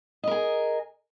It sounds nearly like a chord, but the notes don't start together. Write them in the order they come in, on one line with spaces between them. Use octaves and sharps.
D#5 A#4 G#4